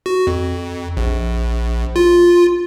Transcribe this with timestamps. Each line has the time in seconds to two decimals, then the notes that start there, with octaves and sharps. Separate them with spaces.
0.06 F#4
0.27 F2
0.97 A#1
1.96 F4